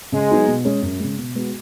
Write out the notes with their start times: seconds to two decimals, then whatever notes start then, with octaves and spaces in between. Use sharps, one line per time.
0.12 C#3 G#3
0.30 F#3 B3 D#4 F#4
0.47 B2
0.65 G#3 C#4 G#4
0.82 F#2
1.00 C#3 G#3
1.18 B2
1.35 G#3 B3 F#4